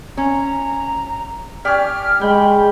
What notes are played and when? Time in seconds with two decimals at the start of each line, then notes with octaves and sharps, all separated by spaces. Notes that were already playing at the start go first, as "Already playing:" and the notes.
0.17 C#4 A#5
1.65 C#4 G4 D5 F6
2.21 G#3 G5 B5